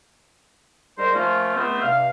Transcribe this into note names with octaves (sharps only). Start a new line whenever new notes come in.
G#2 G3 A#4 C5
F3 A3 A#3 C#4 F4
C#2 A3 B3 C4
G2 C3 F5